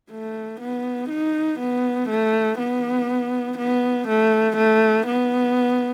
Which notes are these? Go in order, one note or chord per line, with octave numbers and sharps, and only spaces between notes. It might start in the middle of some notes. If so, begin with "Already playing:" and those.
A3
B3
D#4
B3
A3
B3
B3
A3
A3
B3